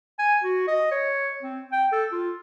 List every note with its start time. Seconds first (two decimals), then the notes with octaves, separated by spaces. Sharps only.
0.19 G#5
0.44 F#4
0.68 D#5
0.91 C#5
1.43 C4
1.72 G5
1.92 A4
2.12 F4